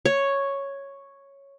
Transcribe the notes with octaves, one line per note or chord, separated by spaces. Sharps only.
C#5